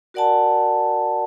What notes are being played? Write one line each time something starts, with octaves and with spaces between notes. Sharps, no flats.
F#4 A#4 D5 F#5 G#5 A5